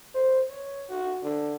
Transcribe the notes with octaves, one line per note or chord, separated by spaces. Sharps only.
C5
C#5
F#4
D3